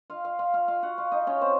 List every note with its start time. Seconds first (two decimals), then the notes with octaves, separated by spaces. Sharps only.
0.10 F4 F5
0.24 F4 F5
0.39 F4 F5
0.54 F4 F5
0.68 F4 F5
0.83 F#4 F#5
0.98 F4 F5
1.12 D#4 D#5
1.27 C#4 C#5
1.41 C4 C5